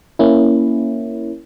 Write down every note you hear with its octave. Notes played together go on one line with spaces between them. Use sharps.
A#3 C#4 E4